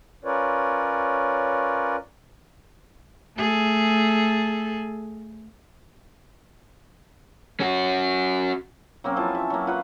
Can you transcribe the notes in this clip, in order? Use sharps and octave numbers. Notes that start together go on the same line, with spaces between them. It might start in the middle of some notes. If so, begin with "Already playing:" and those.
C#4 F4 A#4 B4 C#5 D5
A3 G#4 A4
C#4 F#4
F#3 A#3 C4 C#4
E3 F3 G#5 A5
E5
F#3 A#3
F4 B4 F#5 B5